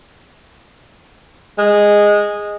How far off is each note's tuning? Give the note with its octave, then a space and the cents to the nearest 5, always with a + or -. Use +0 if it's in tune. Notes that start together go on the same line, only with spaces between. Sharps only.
G#3 -10